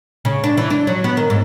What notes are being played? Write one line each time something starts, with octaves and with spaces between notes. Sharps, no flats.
C#3
D4
E3
D4
F#3
B3
D#3
G#2